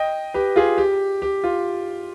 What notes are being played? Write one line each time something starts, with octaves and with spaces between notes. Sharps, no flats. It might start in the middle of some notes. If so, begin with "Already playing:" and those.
Already playing: D#5 G5
G4 B4
F4 G#4
G4
G4
F4